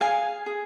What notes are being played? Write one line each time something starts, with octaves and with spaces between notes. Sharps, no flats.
G#4 F5 G#5
G#4